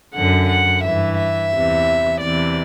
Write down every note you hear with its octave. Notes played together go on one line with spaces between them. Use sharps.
F#2 D3 F#5
F#5
G2 E3 E5
E5
E2 C3 E3
E2 C3 E3 D5